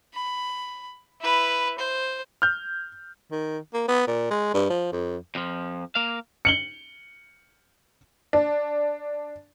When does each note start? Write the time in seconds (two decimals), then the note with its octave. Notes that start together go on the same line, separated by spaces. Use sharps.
0.14 B5
1.21 E4 B4
1.79 C5
2.42 F6 G6
3.32 D#3
3.74 A#3
3.88 B3
4.08 A#2
4.31 G#3
4.54 G2
4.70 F3
4.92 F2
5.35 F2 F3
5.95 A#3 F5
6.45 C#7 F#7 G7
8.33 D4